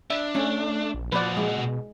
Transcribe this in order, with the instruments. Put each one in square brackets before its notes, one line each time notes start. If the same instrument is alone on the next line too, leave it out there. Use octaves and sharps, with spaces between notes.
[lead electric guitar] D4 [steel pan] E5
[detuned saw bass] A3 [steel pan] C#4
[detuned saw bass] A#1
[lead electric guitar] A#2 F#4 [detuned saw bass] F3 [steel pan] B4 D5
[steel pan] G#3
[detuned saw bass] B2